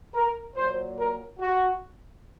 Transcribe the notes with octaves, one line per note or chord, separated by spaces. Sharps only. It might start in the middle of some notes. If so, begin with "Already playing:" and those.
A#4
A#2 F#3 A#3 C5
A#4
F#4